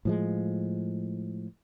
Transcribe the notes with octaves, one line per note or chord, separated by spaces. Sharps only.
A2 F3 G#3